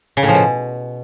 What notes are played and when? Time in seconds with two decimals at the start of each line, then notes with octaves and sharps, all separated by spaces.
0.17 C#3
0.23 A2
0.29 F3
0.34 B2